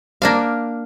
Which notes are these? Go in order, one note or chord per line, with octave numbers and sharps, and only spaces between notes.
A#3 D4 F5